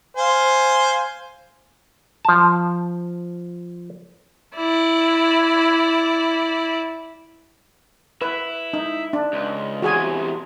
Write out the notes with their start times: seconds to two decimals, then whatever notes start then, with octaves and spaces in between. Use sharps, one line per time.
0.17 C5 F5 G#5
2.25 F3 A5
4.56 E4 D5
8.22 E4 B4
8.73 D#4
9.13 D4
9.33 C#2
9.82 E2 C3 F#4 G#4 G#5